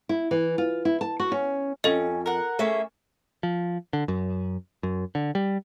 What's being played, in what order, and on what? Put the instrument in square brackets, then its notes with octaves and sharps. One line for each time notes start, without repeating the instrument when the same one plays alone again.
[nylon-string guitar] E4
E3
F4
E4
A5
F#4
C#4
[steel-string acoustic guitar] F2 [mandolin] C#4 [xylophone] A4 D#5
[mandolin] A#4 F#5
[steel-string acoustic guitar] A3 G#4 E5 [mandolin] A#3 C#4
[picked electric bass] F3
D3
F#2
F#2
D3
G3